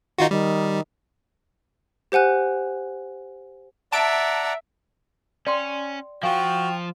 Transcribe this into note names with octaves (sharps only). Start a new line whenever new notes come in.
D#3 D#4 F4 F#4
D#3 G3
G4 C5 F#5 G#5 F#6
D5 E5 F#5 A5 A#5 D7
C#4 D5 G5 C6
F3 F4 F#4 F5 G5 G#5